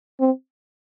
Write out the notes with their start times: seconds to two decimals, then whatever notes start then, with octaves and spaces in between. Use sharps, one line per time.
0.20 C4